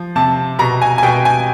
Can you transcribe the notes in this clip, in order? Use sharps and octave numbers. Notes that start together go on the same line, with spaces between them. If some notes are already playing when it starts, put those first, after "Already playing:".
Already playing: F3
C3 A5
B2 A#5
G#5
G#5
B2 G5
G#5